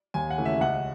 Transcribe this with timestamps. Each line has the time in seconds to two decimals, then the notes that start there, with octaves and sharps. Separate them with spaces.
0.14 D#2 G#5
0.31 F#5
0.38 C#3 E3 A3 C#4
0.45 E5
0.61 C#2 F#5